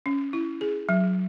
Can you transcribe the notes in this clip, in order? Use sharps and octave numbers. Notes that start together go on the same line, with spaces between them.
C#4
E4
G#4
F#3